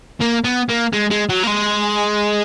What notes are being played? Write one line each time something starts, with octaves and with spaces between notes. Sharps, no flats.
A#3
B3
A#3
G#3
G#3
F#3
A#3
G#3